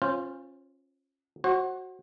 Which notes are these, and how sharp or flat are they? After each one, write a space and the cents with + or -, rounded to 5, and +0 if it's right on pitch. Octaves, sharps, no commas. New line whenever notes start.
C#4 -25 F4 +0 C5 +0
F#4 +5 C5 +40